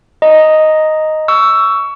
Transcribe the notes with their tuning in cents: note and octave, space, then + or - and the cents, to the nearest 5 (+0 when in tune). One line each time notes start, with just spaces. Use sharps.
D#5 +0 A#5 +0
C#6 +20 E6 +10